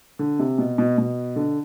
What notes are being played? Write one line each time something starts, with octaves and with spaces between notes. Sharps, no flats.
D3
C3
B2
B2
B2
D3